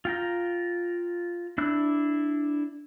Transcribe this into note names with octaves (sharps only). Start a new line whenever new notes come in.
F4 G5 A#5
D4 E4 F#6